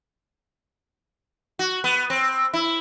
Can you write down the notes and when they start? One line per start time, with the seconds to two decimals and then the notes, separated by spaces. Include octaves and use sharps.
1.59 F#4
1.84 B3
2.10 C4
2.54 E4